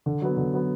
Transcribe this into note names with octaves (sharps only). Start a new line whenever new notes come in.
D3
F#3 B3
D3
F#3 B3